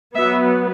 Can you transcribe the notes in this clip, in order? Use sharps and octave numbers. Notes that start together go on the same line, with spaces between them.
F#3 B3 E5